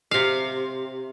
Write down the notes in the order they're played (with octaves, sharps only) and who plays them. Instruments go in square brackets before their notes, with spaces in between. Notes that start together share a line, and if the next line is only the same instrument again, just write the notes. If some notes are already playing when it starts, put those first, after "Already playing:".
[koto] C3 F5